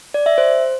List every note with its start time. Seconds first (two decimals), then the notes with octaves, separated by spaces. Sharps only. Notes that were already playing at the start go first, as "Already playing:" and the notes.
0.14 D5
0.26 E5
0.38 C5